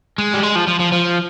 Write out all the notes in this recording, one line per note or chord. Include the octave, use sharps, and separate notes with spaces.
G#3
G3
G#3
F3
F3
F3
F3